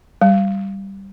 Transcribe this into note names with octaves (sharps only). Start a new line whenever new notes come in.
G3